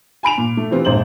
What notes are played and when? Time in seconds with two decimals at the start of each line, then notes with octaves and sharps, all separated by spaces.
0.23 G#5 B5 D7 F7
0.38 A#2
0.57 A3
0.70 C3 E3 B3 C4 F4
0.85 D#1 G#1 C5 F#7